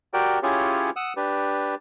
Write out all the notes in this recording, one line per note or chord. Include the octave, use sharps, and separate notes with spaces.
F#4 G4 A#4 D5 G5
C#4 E4 F4 G4 G#4 C#5
F#5 D#6 E6
D4 G4 B4